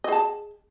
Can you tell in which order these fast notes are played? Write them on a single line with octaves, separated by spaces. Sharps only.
D#5 G#4 A5